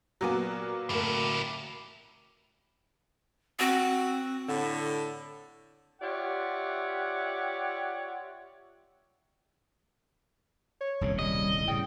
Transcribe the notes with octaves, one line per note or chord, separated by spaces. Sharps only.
A#2 F#3 A#3 B3 F#4 G#5
A2 E4 G4 A#4
C4 F#4
A2 D3
F4 G4 C#5 D5 E5 F#5
C#5
D#1 C2 C#3
G3 D#5
A2 C#3 G3 G5